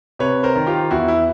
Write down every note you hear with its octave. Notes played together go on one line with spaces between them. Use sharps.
C3 B4 C#5
A#4 C5
D#3
F4 G4
E2 E4 F#4
E4